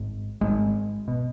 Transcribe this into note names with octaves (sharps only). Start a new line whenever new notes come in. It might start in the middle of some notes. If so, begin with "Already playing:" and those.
Already playing: G#1 G#2
G#1 G#2 G#3
B2